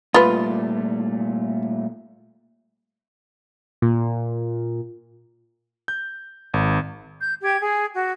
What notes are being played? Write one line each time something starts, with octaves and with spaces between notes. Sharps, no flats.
A#2 G3 A3 F4 B4
A#2
G6
G#1
G6
G4 G5 G#6
G#4 G#5
F#4